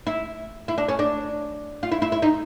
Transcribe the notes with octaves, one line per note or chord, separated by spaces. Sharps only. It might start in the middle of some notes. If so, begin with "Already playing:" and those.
E4
E4
D4
C#4
D4
F4
E4
E4
E4
D#4